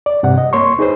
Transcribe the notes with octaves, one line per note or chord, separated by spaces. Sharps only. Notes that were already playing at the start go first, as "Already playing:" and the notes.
D5
G2 C3 F#5
D#5
A#3 C#5 C6 C#6
D#4 G#4 B4 C5